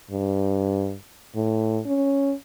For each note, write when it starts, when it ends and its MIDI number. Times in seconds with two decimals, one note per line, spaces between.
0.11 0.96 43
1.36 1.80 45
1.86 2.34 61